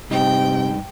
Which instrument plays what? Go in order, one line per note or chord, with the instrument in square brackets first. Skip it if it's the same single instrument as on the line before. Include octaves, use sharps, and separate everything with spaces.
[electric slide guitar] G2 D#4 D#5 [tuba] C3 [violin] G5